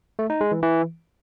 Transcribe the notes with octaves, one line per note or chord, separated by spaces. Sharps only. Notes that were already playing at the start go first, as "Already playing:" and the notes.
A3
D#4
G#3
E3
E3